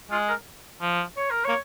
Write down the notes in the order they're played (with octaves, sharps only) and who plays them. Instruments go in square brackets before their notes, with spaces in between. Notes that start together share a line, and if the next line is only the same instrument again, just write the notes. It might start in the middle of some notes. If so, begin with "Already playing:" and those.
[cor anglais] G#3 [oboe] F4
[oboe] A#4
[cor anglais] F3
[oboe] C#5
A#4
[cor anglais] A#3 [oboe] C#5